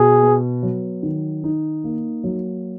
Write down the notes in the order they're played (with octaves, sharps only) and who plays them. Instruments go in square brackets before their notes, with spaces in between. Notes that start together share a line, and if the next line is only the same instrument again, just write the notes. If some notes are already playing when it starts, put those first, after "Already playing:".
Already playing: [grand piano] B2 [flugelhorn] G#4
[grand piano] B3
F#3
D#3
D#4
A#3
F#3